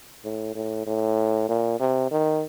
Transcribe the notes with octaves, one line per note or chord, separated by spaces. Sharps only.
A2
A2
A2
A#2
C3
D#3